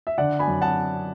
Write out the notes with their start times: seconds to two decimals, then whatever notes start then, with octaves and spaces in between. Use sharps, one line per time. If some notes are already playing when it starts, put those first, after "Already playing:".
0.07 E5
0.18 D3 D5 F#5
0.39 G#5 B5
0.48 F#2
0.61 F#5 A5